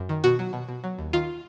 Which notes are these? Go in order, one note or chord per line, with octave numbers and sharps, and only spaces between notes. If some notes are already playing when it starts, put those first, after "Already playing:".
Already playing: F#2
D#3
B2 F#4
F#3
B2
B2
F#3
D#2
D#3 F4